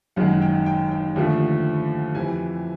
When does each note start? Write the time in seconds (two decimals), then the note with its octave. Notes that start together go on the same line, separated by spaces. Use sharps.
0.16 F#1 F#2 D#3 G#3 F#5
0.42 G5
0.66 G5
0.91 G5
1.16 D#2 D3 F3 A3
2.15 F2 C3 E3 G#5